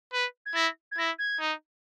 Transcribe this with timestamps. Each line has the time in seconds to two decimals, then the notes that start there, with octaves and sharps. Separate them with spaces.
0.13 B4
0.46 G#6
0.55 E4 A#6
0.91 G#6
0.98 E4 A#6
1.19 G#6
1.40 D#4